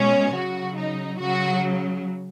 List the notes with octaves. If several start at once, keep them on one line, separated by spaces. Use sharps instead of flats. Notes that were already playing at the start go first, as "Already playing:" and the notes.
Already playing: B2 G#3 C#4 C#5
C#3 F#3 F#4
D#4
C#3 F#3 F#4